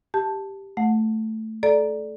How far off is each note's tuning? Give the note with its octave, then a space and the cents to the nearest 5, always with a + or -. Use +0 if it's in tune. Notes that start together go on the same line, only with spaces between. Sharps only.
G4 +0 A5 +0
A3 +0 F#5 -15
A4 -25 D5 +0 A#5 +0